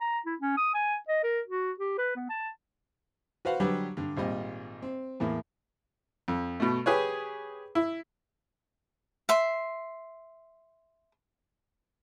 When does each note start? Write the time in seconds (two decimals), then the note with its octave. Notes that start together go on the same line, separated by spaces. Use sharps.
0.01 A#5
0.26 E4
0.40 C#4
0.57 D#6
0.74 G#5
1.08 D#5
1.24 A#4
1.48 F#4
1.80 G4
1.98 B4
2.16 B3
2.30 A5
3.45 F#4 B4 C5 F5 F#5
3.60 D3 F#3 G3 G4 B4
3.97 G2 D3
4.17 G#1 A#2 G3 D#5
4.82 C4
5.20 E2 A2 A#3
6.28 F2
6.60 B2 A3
6.86 G4 G#4 B4 C#5
7.75 E4
9.29 E5 C6